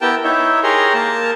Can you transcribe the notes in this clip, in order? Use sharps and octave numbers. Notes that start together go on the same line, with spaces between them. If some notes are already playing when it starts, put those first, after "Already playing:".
B3 E4 G4 A#4 G5 A5
D#4 E4 C#5 E5
G4 G#4 A#4 C#5 A#5 C6
A#3 A#4 A5